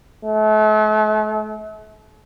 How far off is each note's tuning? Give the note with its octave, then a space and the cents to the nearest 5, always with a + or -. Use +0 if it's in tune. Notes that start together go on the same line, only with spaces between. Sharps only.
A3 -40